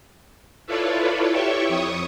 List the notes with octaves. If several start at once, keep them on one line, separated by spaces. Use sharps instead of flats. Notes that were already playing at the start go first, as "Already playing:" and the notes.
E4 F4 A4 B4 C#5 D5
E4 G4 C#5 E5 G5 C#6
F2 C#6 D#6